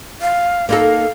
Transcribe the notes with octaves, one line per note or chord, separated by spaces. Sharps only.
F5
A#3 D#4 A4 F5